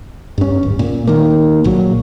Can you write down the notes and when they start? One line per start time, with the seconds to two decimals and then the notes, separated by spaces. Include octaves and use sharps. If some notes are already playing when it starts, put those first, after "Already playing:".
0.38 G2 C#4
0.63 D1
0.79 A#2
1.07 D#3 A#3
1.64 A#1 A#2 F#3